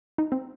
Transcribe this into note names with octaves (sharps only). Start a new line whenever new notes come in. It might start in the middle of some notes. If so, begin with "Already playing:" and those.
D#4
C4